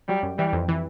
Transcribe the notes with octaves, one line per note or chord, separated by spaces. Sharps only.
F#3 G3
F#2
E3 G3
F2
E3